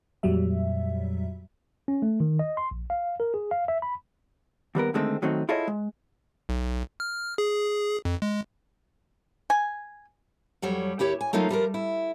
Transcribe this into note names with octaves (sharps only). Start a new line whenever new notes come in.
F2 A#2 F#3 G3 E5
C#4
A3
D#3
D#5
C6
A#1
F5
A#4
G#4
F5
E5
B5
D#2 G3 B3 A#4
D3 D#3 G#3 A3 C4
D#3 F#3 A3 C4 D#4
E4 F4 G#4 A4 C#5 D#5
G#3
B1
F6
G#4
F2
G#3
G#5
F2 F#3 G3 C#5
D#2 E4 G4 C#5
G#5
F#3 A3 A#3 D#4 F4
F3 G3 F4 A#4
E4